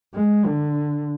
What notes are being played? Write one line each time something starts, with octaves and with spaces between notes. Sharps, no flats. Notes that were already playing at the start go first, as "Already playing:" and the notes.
G#3
D3